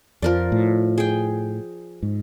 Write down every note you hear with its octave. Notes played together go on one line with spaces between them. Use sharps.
F2 F3 A#4 D5
A2
G#4 G5
G#2